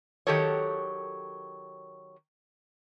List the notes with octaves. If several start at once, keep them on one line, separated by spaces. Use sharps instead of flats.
D#3 F#3 G4 A4 A#4 C#5